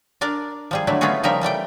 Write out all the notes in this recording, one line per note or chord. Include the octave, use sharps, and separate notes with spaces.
D4 A#4 D5
F3 G3 G#4
D3 F#3 A3 E4
A3 B3 C#4 F4 F#4 G#4
C#3 F3 G3 D#4 A#4 E5
E3 G3 A3 G5